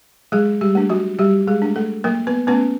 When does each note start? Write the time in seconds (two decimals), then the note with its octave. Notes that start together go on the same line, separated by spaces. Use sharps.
0.32 F#3 G#3 G#4
0.61 G3 G4
0.75 A3 D4
0.90 F#3 F#4
1.19 F#3 G3 G4
1.48 G#3 G#4
1.62 A3 D4
1.76 A3 A4
2.04 F#3 A#3 A#4
2.27 B3 B4
2.47 A3 B3 C#4 B4